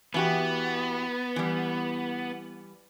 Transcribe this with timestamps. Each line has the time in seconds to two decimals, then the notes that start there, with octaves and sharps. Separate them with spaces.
0.14 E3 B3 F#4 G4
1.36 E3 G3